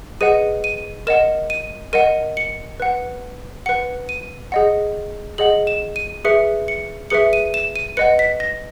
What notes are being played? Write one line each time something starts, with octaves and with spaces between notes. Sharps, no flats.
G#4 B4 D#5 F#5 D#7
D#7
A#4 D#5 F#5 E7
D#7
A#4 D#5 F#5 D#7
C#7
B4 F#5
B4 F#5 C#7
D#7
G#4 D#5 F#5
G#4 D#5 F#5 F#7
E7
D#7
G#4 B4 E5 C#7
C#7
G#4 B4 E5 C#7
D#7
E7
D#7
B4 D#5 F#5 C#7
B6
A#6